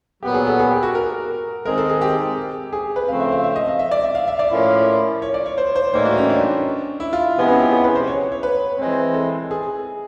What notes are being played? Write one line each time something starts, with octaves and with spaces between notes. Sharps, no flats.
A#2 F#3 B3 G4
G#4
A4
G#4
G4
F#4
A#4
D#3 G#3 C4 A#4
A4
G#4
G4
G#4
B4
C#3 F3 A3 C4 F5
E5
F5
E5
D#5
F5
E5
D5
E5
F5
E5
D5
A2 F3 A#3 C#4 E4
C#5
D5
C#5
C5
C5
A2 E3 G3 A#3 D#4 C5
F#4
C#4
D4
E4
F4
C3 F3 G#3 B3 E4
C#4
G4
G#4
B4
C5
C#5
C#5
B4
E3 G#3 C4
A4
G#4